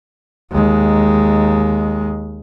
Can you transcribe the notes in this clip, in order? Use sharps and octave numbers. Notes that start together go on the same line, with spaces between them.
D#2 G#3